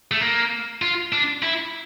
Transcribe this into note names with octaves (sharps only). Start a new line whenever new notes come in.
A3
A#3
F4
D4
E4